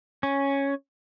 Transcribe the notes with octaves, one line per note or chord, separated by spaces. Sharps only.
C#4